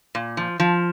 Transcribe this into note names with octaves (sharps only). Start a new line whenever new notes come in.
A#2
F3
F3